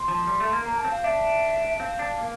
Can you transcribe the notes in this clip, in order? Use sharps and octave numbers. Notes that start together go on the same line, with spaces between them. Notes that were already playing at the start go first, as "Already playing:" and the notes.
Already playing: C6
F3
G3
A3
A#3
A#3 A#5
A5
C4
F5
D4 E5
C4 F5
D4
A#3